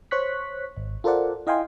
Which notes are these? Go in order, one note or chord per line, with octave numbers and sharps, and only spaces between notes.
C5 C#5 C#6 F#6 B6
G#1
F4 A4 A#4 C5 D5 F#5
E4 D#5 F5 G5 G#5 C6